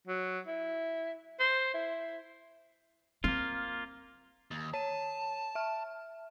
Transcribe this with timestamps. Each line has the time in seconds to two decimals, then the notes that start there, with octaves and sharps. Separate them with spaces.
0.07 F#3
0.47 E4
1.40 C5
1.74 E4
3.24 A#3 C4 F4
4.51 D#2
4.74 C#5 A5 D#7
5.55 E5 F6